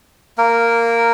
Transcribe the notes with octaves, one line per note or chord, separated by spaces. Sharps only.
A#3 A#4